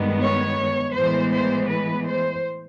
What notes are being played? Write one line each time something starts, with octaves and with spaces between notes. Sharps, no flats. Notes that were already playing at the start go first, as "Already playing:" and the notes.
Already playing: G2 D#3 G#3 B3
C#5
A2 E3 G#3 B3 C5
C5
B4
C5